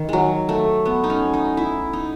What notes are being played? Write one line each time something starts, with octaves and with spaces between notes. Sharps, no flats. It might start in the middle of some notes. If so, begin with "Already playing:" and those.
Already playing: D#3
F#3 G#3
A3
B3
D#4
C#4
D#4
E4
D#4